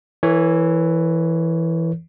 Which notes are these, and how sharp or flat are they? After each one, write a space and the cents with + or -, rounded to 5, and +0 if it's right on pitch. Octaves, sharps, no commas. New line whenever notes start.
E3 +0 A#4 -45 C#5 +0